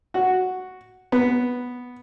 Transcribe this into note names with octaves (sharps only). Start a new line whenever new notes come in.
F#4
B3